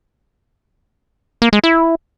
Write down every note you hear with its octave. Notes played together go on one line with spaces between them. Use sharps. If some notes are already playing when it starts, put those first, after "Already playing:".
A#3
G#3
E4